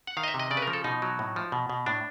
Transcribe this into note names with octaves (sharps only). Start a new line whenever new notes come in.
F#5
D#3 F5
D#5
E5
C3
D#5
C#3 D5
B4
A#4
F3
A4
B2 D#4
F#3
A2
F3
B2
B2
A2 D4